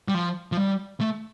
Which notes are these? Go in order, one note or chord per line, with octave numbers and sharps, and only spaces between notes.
G3
F3
F3
G3
A3